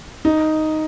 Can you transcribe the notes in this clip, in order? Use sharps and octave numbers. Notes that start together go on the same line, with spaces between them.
D#4